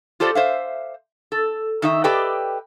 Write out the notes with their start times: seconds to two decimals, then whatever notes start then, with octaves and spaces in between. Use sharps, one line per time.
0.20 F4 G4 A4 C5 D5
0.35 C5 E5 F5
1.32 A4
1.82 D#3 D#4 E5
2.04 G4 A4 B4 D5 D#5 G5